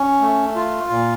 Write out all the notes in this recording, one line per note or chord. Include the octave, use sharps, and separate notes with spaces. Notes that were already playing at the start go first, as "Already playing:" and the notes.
Already playing: C#4
A3
F4
A#2